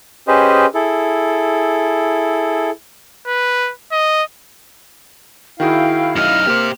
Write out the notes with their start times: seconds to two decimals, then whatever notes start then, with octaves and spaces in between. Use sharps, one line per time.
0.28 C#4 G4 G#4 B4 C5 D#5
0.75 E4 G#4 A4
3.27 B4
3.92 D#5
5.60 D#3 E4 F#4 G#4 F5 G5
6.16 F#2 D#4 F6
6.47 A#3 G4 C5